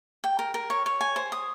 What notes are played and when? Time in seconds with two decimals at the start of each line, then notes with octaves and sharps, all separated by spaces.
0.24 G5
0.39 A#4
0.54 A#4
0.70 C#5
0.86 C#5
1.01 G#5
1.16 C5
1.32 D#6